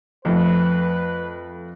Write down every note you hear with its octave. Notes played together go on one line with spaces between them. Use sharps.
F2 A3 B4